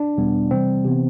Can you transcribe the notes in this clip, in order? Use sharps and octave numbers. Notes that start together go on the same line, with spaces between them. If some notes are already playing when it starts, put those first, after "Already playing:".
Already playing: D4
E2 B2 G3 B3
C3 E3 G3 C4
C3 E3 B3